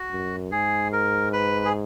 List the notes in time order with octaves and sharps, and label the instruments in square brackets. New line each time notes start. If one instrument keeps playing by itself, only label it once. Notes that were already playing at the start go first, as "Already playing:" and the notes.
Already playing: [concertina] F#4
[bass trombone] F#2
[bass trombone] G#2 [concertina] G#4
[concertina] A#4
B4
G#4